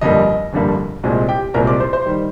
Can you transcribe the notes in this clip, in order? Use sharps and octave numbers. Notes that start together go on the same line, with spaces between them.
G1 F2 D3 G3 A#3 D#5
G1 F2 D3 G3 A#3
C2 A#2 G#3 C4
G4 G5
C2 A#2 G#3 C4 A#4 A#5
D5 D6
C5 C6
C5 C6
D#3 G3